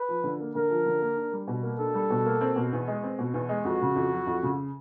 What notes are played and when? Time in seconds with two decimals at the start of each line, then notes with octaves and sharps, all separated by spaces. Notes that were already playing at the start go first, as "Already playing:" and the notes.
Already playing: B4
0.09 F3
0.24 D3
0.40 A#3
0.55 D3 A#4
0.70 F3
0.86 D3
1.01 A#3
1.16 D4
1.32 G3
1.47 B2
1.63 A#3
1.79 D4 A4
1.94 G3
2.10 B2
2.25 A#3
2.41 C4
2.56 B2
2.73 E2
2.88 G#3
3.04 C4
3.19 B2
3.34 E2
3.49 G#3
3.65 F2 F#4
3.81 C#3
3.96 F2
4.12 F#3
4.27 F2
4.43 C#3